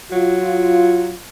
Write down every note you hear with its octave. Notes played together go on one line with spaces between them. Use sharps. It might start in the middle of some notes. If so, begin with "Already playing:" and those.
F#3 F4